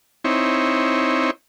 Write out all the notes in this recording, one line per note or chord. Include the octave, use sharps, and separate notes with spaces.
C4 D#4 E4 C#5